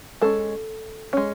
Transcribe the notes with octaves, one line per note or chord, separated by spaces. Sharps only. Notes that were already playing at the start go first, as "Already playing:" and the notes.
G#3 C#4 A4
G#3 C#4